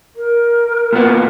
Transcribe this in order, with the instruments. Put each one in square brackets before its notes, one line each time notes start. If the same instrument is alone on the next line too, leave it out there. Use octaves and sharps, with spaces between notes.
[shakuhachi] A#4
[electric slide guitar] A#2 B3